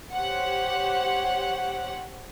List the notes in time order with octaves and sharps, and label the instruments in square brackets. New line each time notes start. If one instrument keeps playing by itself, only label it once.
[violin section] G4 C5 C#5 F#5